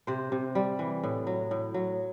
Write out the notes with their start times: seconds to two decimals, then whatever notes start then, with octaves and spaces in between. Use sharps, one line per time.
0.07 C3 C5
0.32 C3
0.55 G3
0.79 E3
1.03 A2
1.27 F#3
1.51 A2
1.74 F#3